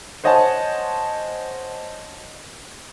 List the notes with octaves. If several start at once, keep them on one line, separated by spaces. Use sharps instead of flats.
C5 C#5 D#5 F#5 G#5 A5